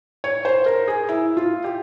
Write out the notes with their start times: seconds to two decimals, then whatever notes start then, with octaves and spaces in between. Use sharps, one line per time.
0.24 C#5
0.45 C5
0.66 A#4
0.88 G#4
1.08 E4
1.37 F4
1.64 G4